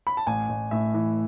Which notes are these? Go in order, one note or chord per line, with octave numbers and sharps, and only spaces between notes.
B5
A5
A1 G#5
A1
A2 E5
E3